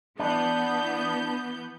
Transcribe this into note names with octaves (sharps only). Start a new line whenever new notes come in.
E3 B3 D4 G6